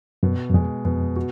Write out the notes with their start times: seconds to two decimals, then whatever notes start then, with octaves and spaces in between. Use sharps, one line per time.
0.23 F#2 B2
0.50 F#2
0.54 F2 G#3
0.85 F2 B2
1.16 F#4